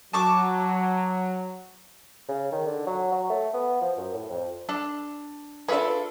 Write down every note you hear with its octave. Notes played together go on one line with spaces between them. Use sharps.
F#3 A5 C#6 D6
C#3
D#3
D3
F#3
F#3
A3
B3
F3
F#2
A2
F2
D4 A4
D4 F4 G#4 A4 B4 E5